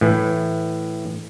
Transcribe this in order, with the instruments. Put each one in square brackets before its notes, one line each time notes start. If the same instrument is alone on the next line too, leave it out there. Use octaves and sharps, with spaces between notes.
[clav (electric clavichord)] A2 E3